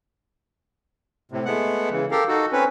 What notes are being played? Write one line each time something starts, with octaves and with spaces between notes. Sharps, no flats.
A2 C3
G#3 A3 B3 F#5
C#3 E3
G4 A4 A#4 F5
D#4 F#4 A4
C4 C#4 B4